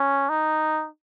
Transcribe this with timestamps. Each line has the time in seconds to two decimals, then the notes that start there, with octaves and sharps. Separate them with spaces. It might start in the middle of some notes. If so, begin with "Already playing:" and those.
Already playing: C#4
0.29 D#4